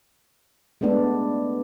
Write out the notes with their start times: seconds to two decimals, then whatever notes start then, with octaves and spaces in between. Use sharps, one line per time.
0.81 G#3 A3 B3 D4